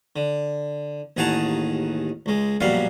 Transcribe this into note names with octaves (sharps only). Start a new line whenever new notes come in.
D3
A1 D#2 G#4 F#5 A5 A#5
C#2 G#3
A#1 F#2 B2 G3 F5 F#5